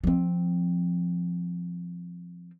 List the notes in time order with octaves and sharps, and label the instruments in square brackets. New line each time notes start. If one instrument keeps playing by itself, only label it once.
[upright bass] F3 C4